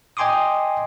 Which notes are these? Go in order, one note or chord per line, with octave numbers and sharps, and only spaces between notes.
D#5 G5 G#5 C6 D6 D#6